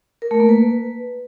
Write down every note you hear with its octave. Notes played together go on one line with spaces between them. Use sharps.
A#4
A3
A#3
B4